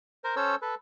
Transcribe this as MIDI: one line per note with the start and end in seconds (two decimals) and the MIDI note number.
0.24 0.35 70
0.24 0.35 72
0.36 0.55 61
0.36 0.55 69
0.36 0.55 72
0.36 0.55 73
0.36 0.55 88
0.62 0.75 69
0.62 0.75 71